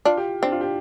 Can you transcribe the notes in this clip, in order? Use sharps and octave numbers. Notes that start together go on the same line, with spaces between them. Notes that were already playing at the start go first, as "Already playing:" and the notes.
D4 F4
G4
C4 D4
F4
G4